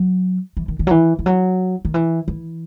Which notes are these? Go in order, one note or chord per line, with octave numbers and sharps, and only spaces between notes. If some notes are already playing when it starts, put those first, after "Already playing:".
Already playing: F#3
E3
D#3
D#3
F#3
E3
E3
F#3
D#3
E3
E3